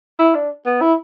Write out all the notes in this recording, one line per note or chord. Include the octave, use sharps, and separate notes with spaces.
E4
D4
B3
E4